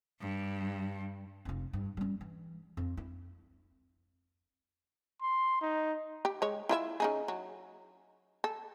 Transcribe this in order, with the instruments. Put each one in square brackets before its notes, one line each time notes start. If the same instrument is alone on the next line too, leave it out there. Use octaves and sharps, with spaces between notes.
[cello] G2
[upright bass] F1 F4
G2
G3 C#4
E3
F2
E4
[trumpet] C6
D#4
[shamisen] G4
G#3 C#5
E4 F4 E5
C#3 D#4 G#4
F#3
A4